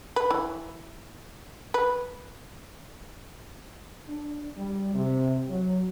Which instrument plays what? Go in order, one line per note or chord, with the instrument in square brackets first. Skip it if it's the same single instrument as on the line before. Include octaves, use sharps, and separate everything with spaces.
[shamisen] B4
E3
B4
[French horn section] D4
G3
C3
F#3